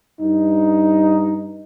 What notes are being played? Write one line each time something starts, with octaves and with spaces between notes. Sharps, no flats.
G2 D#4